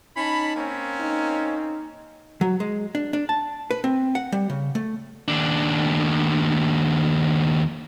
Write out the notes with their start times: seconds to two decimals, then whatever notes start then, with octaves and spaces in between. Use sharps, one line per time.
0.17 C#4 D#4 A5 B5
0.56 A#3 C4 C#4
1.01 D#4
2.41 F#3
2.60 G#3
2.95 D4
3.13 D4
3.29 A5
3.71 B4
3.84 C4
4.15 F#5
4.32 G3
4.50 C#3
4.75 A3
5.28 D#2 D4